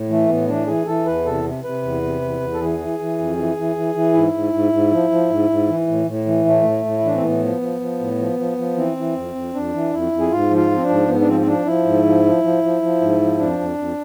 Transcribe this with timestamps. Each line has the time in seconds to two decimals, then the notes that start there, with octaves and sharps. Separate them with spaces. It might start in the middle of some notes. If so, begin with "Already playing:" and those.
Already playing: A2
0.09 E3 A3
0.29 A2 B3
0.48 E3 D4
0.67 E3 G#4
0.86 E3 A4
1.06 E2 B4
1.25 C3 A4
1.44 C3
1.64 C3 B4
1.83 E2
2.02 C3
2.21 E2
2.40 E2
2.54 A4
2.60 E3 G#4
2.79 E3
2.99 E3
3.19 F2
3.37 E3
3.57 E3
3.76 E3
3.95 E3
4.14 G#2 E4
4.33 G#2
4.53 G#2
4.72 G#2
4.91 F3
5.10 F3
5.30 G#2
5.50 G#2
5.68 E3
5.88 A2
6.07 A2
6.26 E3
6.45 A2 A3
6.64 A2
6.85 A2
6.98 E4
7.03 E3 D4
7.14 C4
7.22 A2 B3
7.43 F3
7.61 F3
7.80 F3
8.00 A2
8.19 F3
8.39 F3
8.58 F3
8.76 E3 C4
8.97 E3
9.16 F2
9.35 F2
9.54 F2 D4
9.74 E3
9.92 F2 E4
10.12 F2
10.20 G#4
10.31 G#2 F4
10.51 F3
10.57 F4
10.70 F3
10.77 C4
10.83 D4
10.89 G#2
11.08 G#2 B3
11.21 D4
11.27 F3 C4
11.40 C4
11.46 F3 D4
11.66 F3 E4
11.85 G#2
12.05 F3
12.25 F3
12.43 F3
12.63 F3
12.82 F3
13.01 G#2
13.21 F3
13.39 F2 D4
13.59 F2
13.78 F2